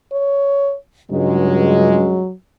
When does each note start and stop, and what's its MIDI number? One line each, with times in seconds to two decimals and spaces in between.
0.12 0.76 73
1.11 2.24 37
1.11 2.24 43
1.11 2.33 54
1.11 2.24 56